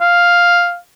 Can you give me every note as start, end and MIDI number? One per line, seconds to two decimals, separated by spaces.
0.01 0.77 77